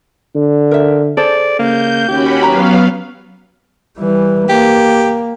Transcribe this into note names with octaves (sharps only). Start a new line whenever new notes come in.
D3
A#4 E5
G#4 A4 C5 D5
C#3 A#3 G6
D#2 C#4 F#4 G4 B5
F#3 B3 F5 A#5
E3 G3
A#3 G4